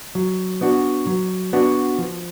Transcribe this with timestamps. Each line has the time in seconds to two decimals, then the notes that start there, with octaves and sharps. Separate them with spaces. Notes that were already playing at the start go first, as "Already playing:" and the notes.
0.15 F#3
0.61 B3 D4 F#4
1.07 F#3
1.53 B3 D4 F#4
1.98 F3